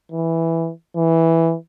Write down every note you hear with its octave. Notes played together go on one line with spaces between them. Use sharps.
E3
E3